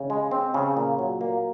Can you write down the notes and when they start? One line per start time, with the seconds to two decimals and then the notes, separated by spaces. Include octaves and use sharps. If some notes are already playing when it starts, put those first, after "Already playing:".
Already playing: C#3
0.10 G#3
0.31 C4
0.54 C#3
0.77 A#2
0.99 F#3
1.21 A#3